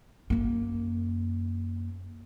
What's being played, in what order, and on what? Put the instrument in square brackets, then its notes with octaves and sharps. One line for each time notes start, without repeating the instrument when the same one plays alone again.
[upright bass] F#2 A#3